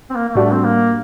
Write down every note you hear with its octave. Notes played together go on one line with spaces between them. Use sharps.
C4
A#3
A#3
A2 G3 A3 D4 F#4
C4
A#3